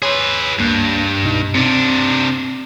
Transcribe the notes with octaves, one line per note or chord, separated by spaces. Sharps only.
G#4 B4 C#5 C6
C#2 G2 A#3 F#6
C2 B2 D#4
C3 C4 D4